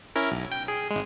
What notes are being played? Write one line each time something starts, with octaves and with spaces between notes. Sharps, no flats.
C#4 E4 A#4
B1
G5
G#4
G#1 G#3